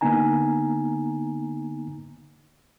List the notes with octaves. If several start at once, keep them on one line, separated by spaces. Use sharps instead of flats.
D3 A#3 B3 D#4 G#5 A#5